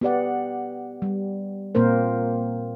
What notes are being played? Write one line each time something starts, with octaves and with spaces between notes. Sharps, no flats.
B3 G4 D5 F#5
G3
A#2 A#3 C4 A#4 C5